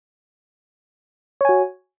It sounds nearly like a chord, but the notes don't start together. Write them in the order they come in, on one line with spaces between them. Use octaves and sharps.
C#5 G#5 F#4